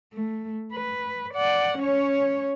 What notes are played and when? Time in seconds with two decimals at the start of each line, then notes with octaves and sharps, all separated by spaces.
0.13 A3
0.73 B4
1.34 D5 F#5
1.78 C#4 C#5